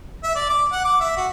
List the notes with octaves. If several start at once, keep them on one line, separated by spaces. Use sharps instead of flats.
E5
D5
D6
F#5
D6
E5
F#4